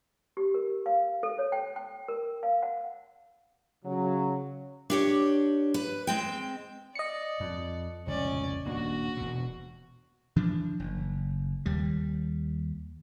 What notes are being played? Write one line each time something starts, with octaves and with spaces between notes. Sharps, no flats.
G4
A#4
F5
A4
C#5
G5
G5
A#4
F5
F#5
C#3 F#3
D4 G4 C#5
B4
G#3 C4 G5
D5 D#5 C#7
F2
F1 C#2 A#2 C#4 D5
D#1 A#3 D4 F#4
E1 B2
E3 F3 D4
F#1
D#2 G3